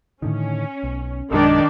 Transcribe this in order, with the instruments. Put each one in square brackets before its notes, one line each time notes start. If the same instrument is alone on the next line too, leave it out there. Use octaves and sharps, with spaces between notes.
[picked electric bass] A2 D3 D#3 [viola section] C#4
[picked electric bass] B1
[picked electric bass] A#1 F#2 G#3 [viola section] D#3 D4 D5